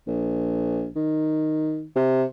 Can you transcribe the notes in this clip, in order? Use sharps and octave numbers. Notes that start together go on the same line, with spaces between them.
A#1
D#3
C3